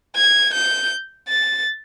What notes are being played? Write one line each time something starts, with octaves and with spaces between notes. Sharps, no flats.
G#6
G6
A6